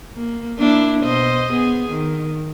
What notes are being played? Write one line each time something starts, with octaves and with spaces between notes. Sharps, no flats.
A#3
A#3 D4 E4
B2 C5 D#5
B3 G#4
D#3